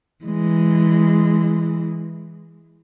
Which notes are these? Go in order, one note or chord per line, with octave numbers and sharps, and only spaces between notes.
E3 G#3